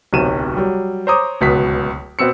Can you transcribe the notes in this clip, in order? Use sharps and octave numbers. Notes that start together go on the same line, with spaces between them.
D1 B1 C3 D#7 E7
F#3 G3
C5 C#5 A#5 D6 D#6
D1 C#2 B2 D#6 B6
B2 B3 C4 E6 C#7